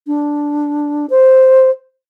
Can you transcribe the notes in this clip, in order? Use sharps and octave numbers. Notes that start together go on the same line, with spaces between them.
D4
C5